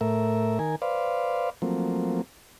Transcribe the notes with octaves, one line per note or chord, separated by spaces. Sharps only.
A2 A3 A#4 E5
D#3 A#4 G#5
B4 C5 D5 F5
F3 F#3 A3 A#3 C4